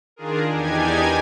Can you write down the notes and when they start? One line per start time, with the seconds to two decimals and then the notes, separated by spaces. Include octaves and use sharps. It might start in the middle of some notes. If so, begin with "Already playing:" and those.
0.16 D#3 D4 F4 G#4 A#4
0.50 E2 D4 D#4 G4 G#5 G#6